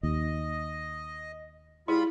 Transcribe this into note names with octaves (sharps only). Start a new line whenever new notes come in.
D#2 D#5
G3 E4 F4 G#4 B5